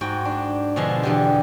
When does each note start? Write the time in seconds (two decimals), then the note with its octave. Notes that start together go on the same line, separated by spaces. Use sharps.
0.01 G#2 F#4 G5
0.25 D4
0.76 B2 D3 F3 G#3
1.03 E2 D3 G4